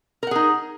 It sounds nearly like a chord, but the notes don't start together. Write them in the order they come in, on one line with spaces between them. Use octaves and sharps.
A#4 F#5 G#4 D#4